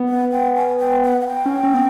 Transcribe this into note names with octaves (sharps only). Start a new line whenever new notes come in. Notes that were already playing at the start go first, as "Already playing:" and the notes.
Already playing: B3
F#5
G5
G#5
G5
F#5
F#5
G5
C#4
C#4
B3